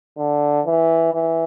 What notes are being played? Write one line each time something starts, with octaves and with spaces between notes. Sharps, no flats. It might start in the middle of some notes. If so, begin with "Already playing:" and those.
D3
E3
E3